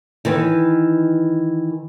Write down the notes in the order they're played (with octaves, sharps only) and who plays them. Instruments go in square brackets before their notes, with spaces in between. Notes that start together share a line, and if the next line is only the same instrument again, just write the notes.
[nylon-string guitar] D#3 E3 B4